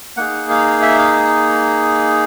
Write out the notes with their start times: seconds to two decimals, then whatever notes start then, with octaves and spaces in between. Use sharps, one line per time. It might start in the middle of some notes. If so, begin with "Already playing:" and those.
0.17 A#3 D#4 G#4 F#5
0.50 F5
0.82 E5
0.98 F5